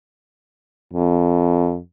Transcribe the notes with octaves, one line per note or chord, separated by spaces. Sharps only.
F2